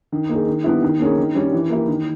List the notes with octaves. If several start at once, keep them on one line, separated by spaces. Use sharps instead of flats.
D#3
A#3 D#4 G#4
D#3
G3 B3 E4
D#3
A#3 C#4 G#4
D#3
G3 C#4
E3
A#3 E4 G4
D#3